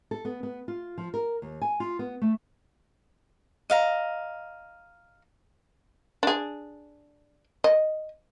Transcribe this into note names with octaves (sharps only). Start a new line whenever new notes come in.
A4
B3
B3
F4
F3
A#4
D#2
G#5
F4
B3
A3
D#5 F5 A#5
D4 G#4
D#5